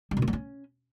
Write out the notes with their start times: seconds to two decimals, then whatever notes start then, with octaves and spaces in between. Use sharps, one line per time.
0.11 G3
0.17 B2
0.22 A#3
0.28 F#3
0.33 C#4